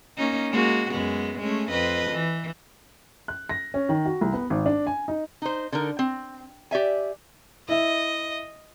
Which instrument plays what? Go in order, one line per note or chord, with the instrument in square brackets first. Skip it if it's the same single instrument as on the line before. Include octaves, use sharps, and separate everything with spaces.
[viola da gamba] A#3 C#4 D#4
G#3 A#3 F#4
F#2 G#3 B3
G#3 A3 C#4
F2 B4 D#5
E3
[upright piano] F#6
A#6
C#4
D#3
F#4
C2
B3
G#1
D4
G#5
D#4
[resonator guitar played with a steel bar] D#4 C5
D3 D#4 A#4
C4
G4 D5 E5 G#5
[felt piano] E4 E5 [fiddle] D#5